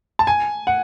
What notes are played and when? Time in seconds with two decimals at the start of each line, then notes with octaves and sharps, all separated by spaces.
0.19 A5
0.27 G#5
0.67 F#5